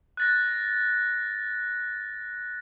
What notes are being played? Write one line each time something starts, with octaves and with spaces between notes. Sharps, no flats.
F#6 A6 A#6